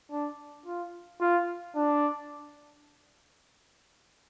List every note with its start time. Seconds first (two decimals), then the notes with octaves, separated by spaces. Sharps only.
0.11 D4
0.66 F4
1.21 F4
1.76 D4